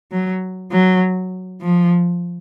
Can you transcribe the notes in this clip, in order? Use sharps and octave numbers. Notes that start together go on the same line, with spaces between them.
F#3
F#3
F3